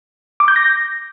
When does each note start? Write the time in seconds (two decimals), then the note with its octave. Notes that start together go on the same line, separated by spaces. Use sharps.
0.40 D6
0.48 G6
0.56 A#6